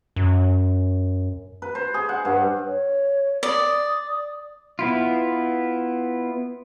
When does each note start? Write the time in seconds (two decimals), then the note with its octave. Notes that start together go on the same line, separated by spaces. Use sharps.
0.16 F#2
1.62 B4
1.75 C5
1.94 G#4
2.09 F#5
2.25 G2
2.67 C#5
3.43 D5 D#6
4.79 B3 E4 F4